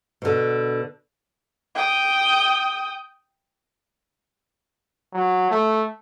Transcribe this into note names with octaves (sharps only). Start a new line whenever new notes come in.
B2 D3
G5 D#6
F#3
A3